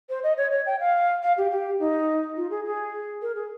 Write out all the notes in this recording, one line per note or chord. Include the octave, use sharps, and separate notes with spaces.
C5
D#5
C#5
C#5
G5
F5
F5
G4
G4
D#4
F4
G#4
G#4
A#4
G#4